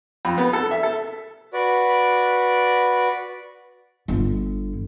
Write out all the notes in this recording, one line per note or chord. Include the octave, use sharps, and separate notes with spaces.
F2
B3
A4
E5
A4
F#4 B4 D5
G1 D3